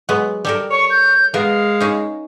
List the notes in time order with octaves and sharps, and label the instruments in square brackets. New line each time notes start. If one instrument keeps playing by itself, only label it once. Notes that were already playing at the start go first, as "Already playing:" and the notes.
[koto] F#3 G#3 B3
G3 A4 A#4
[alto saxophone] C#5 [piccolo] C#6
[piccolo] G6
[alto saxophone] G#3 [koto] B3 A#4 [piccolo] F5
[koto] C#4 D#4